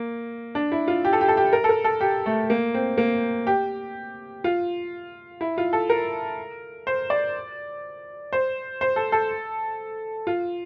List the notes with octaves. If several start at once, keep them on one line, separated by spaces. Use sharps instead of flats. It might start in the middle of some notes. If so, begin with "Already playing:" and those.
Already playing: A#3
D4
E4
F4
G4
A4
G4
A4
G4
A#4
A4
A#4
A4
G4
A3
A#3
C4
A#3
G4
F4
E4
F4
A4
A#4
C5
D5
C5
C5
A4
A4
F4